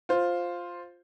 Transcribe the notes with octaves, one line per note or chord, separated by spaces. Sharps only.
F4 C5